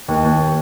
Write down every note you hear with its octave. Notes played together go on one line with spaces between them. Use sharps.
D#2
D#2